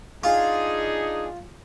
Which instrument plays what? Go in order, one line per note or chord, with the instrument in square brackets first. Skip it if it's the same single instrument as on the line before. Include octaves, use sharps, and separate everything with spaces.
[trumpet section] D4 D#4 G#4 [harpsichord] F4